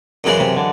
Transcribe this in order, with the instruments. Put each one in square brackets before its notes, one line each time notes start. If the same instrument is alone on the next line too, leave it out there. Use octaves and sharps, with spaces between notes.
[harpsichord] F#2 C#3 E3 G#3
[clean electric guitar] C3
D3